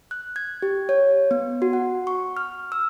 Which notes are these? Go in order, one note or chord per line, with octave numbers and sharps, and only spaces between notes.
F#6
G#6
G4
C#5
B3
F#4
F#5
C#6
F6
E6